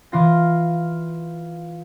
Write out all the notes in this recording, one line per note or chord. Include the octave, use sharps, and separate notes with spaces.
E3 F4 A#6